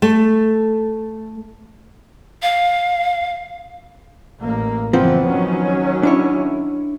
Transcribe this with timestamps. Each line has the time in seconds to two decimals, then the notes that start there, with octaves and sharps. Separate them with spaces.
0.02 A3
2.43 F5
4.41 A1 A#3
4.93 F#1 E3 F3 B3 C4
5.27 D#3 F#3 C#4
6.03 D4 E4 C#5